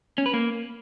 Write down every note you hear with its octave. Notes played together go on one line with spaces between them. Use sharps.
C#4
B4
A#3